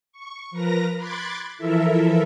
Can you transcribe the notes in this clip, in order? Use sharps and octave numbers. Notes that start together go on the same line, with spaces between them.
C#6
F3 A#4 B4 A#5 A#6
B5 C6 D6 F#6 G#6 A6
E3 F3 E4 A4 A#4 E5